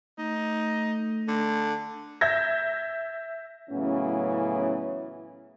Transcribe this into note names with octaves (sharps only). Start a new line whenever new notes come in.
A3 D#4
D3
E5 G6 G#6 A#6
A2 C#3 E3 F#3 B3 C#4